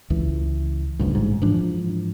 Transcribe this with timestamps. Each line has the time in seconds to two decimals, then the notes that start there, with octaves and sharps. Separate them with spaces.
0.10 C#2 E3
0.99 D1 C#2 G2
1.15 A1 G#2
1.42 G#2 E3 F3 D4